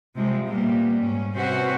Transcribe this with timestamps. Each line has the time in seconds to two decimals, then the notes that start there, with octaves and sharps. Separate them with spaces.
0.16 C3 F3 G3 G#3
0.47 A#2 G3 A#3 B3
0.99 G#2 C#4
1.35 C3 C4 C#4 F#4 B4 C5